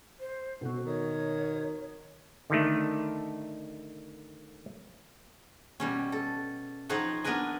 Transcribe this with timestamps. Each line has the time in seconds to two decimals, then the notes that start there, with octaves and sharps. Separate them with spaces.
0.20 C5
0.61 B2 C4 F#4 A4
0.86 D#3 C#5
2.50 D3 D#3 A3
5.80 B2 G3 C#4
6.12 A4
6.89 F3 C4 D#4 B4 C#5 F#5
7.24 B3 D4 A#4 B4 G#5